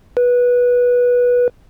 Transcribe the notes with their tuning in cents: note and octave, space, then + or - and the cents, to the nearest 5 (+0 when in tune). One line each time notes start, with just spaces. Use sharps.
B4 -15